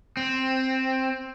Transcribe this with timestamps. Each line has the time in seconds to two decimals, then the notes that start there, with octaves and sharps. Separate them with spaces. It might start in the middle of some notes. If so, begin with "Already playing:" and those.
0.17 C4